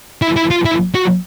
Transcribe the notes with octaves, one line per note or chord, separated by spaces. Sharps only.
E4
E4
F4
E4
F#4